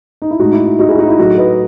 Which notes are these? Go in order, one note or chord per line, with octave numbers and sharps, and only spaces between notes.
D#4
E4
A2 G#3 D#4 F#4
E4
E4
D#4 F#4
E4 G#4
D#4 F#4
E4
A2 F#3 A3 D#4 F#4
B4 D#5